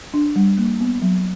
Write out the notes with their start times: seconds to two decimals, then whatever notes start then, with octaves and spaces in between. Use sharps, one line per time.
0.14 D4
0.36 G3
0.58 A#3
0.80 B3
1.02 F#3